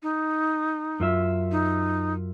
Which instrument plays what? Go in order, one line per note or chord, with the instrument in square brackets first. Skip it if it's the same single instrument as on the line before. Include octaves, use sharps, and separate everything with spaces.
[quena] D#4
[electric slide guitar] F#2 F4 E5
[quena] D#4